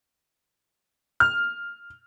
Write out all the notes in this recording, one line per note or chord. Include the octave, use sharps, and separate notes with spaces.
F6